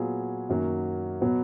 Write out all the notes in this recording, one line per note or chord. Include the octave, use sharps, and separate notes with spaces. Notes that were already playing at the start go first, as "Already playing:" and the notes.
Already playing: A#2 F#3 B3 F4 G#4
F#2 D#3 F#3 A#3
B2 F#3 B3 F#4